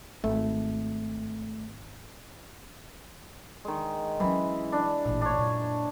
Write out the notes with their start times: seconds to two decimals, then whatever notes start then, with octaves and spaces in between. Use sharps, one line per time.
0.24 G#1 A3
3.65 D#3 G#3
4.20 E3 F#3 C#4
4.72 D4
5.05 A1 A#2
5.21 D4 C#5
5.38 F#2 A#2